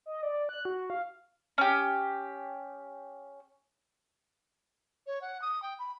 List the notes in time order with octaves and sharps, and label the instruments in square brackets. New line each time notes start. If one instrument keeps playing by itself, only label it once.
[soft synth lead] D#5
D5
F#6
F#4
F5
[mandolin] C#4 G4
[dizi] C#5
F#5
D#6
G5
B5